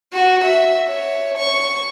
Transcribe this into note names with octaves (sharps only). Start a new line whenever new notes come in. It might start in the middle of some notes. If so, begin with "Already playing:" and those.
F#4
E5
C#5
C#6